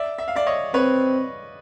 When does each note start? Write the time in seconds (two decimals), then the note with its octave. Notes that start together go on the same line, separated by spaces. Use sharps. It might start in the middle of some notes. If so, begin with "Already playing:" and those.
Already playing: D5 E5
0.18 E5
0.28 F5
0.36 D5 E5
0.47 C#5 D#5
0.74 C4 B4 C#5